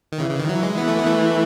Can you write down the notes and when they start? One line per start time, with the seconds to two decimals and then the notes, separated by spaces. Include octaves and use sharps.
0.12 D#3
0.20 C#3 E3
0.30 C#3
0.39 D#3
0.49 E3 F#3
0.63 G#3
0.78 E3 B3
0.88 A3
0.98 B3
1.07 A3